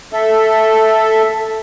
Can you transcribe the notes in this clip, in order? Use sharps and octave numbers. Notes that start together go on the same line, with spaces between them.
A4 E5